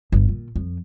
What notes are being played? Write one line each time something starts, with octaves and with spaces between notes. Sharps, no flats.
G1
A#2
F2